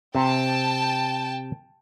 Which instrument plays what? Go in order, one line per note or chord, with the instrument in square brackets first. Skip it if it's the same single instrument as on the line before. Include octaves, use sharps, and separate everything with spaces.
[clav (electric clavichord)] C3 C4 [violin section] G5 A5